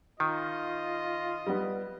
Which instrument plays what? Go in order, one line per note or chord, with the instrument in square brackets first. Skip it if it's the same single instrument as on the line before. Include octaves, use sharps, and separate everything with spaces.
[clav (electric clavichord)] D#3 [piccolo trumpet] F4 [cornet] D#5
[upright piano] G3 B3